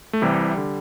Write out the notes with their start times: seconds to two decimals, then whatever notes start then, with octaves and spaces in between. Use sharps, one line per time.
0.13 A3
0.22 C2 C3 E3 G3
0.57 D3